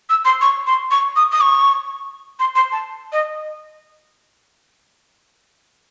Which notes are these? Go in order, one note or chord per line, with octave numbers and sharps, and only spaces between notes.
E6
C6
C#6
C6
C#6
D#6
D#6
C#6
C6
C6
A5
D#5